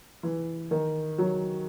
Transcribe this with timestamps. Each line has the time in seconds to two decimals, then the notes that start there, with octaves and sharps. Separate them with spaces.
0.23 E3
0.71 D#3
1.18 F#3